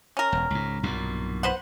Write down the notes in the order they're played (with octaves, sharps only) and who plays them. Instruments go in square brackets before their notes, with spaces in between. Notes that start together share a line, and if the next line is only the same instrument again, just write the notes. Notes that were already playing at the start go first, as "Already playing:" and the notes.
[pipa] C#4 A#4
[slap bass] E1
C#2 G#2
B1 G2 A#2
[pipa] B4 C5 F#5